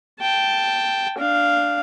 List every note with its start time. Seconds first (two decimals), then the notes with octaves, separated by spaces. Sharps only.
0.20 G5 A5
1.18 D4 F5